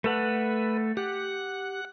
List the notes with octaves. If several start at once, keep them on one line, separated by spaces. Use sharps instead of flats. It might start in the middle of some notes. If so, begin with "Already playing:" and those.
A3 A4 B4 F#5
G4 F#5